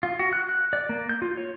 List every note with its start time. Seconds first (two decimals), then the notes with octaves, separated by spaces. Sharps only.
0.03 F4
0.19 F#4
0.33 F#6
0.49 F#6
0.73 D5
0.89 A#3
1.09 G6
1.22 F4
1.37 C#5